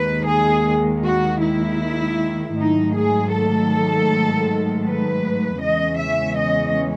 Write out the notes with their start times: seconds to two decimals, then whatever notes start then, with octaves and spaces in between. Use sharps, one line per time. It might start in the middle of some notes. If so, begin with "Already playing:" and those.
Already playing: D#2 D#3 G#3 B4
0.28 G#4
1.05 F#4
1.43 E4
2.57 G#2 D#3 F#3 A3 D#4
2.96 G#4
3.33 A4
4.85 B4
5.62 E2 C#3 E3 G#3 C#4 D#5
6.00 E5
6.39 D#5